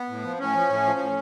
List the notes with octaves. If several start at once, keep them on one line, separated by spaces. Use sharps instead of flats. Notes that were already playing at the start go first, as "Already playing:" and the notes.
Already playing: B3
A2
F3
A2 C#4
F3
A2
F3
A2